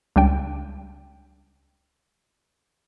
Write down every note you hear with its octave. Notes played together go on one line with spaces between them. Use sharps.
C#2 G3 D4 G5